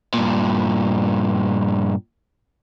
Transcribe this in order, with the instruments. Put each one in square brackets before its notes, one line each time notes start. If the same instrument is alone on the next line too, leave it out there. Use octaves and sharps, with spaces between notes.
[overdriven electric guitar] G2 A#2